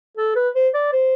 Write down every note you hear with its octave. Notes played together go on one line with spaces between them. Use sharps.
A4
B4
C5
D5
C5